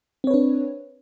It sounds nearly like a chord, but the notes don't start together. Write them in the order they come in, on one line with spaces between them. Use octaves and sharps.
C4 C#5 B4 D4